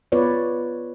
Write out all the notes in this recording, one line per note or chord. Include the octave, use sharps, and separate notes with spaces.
B3 F4 B4 C#5 D5